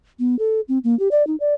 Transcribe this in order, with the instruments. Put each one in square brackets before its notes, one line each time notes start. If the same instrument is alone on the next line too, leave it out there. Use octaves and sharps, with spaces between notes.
[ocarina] B3
A4
C4
A#3
G4
D5
D#4
D5